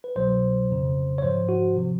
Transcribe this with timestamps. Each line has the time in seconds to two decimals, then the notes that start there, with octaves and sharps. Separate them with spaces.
0.04 B4
0.16 C2 B2 F#3 C5
0.69 G1 F2 C#3
1.18 C#5
1.22 A1 G#2 F3 C5
1.49 F#4
1.76 C3 F3